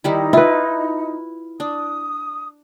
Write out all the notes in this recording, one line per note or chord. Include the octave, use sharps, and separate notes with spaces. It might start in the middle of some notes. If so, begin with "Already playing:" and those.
D#3 G3 D#4 E4
E4 F4 B4
D4 D#6